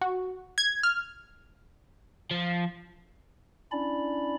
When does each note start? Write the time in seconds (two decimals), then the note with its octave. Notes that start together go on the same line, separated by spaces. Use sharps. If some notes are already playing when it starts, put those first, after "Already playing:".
0.01 F#4
0.58 G#6
0.83 F6
2.31 F3
3.72 C#4 D4 E4 D5 B5